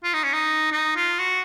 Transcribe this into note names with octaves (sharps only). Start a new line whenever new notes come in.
F4
D#4
C#4
D#4
D#4
F4
F#4